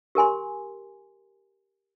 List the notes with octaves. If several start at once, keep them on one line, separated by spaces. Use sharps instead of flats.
G4 A#4 G#5 C6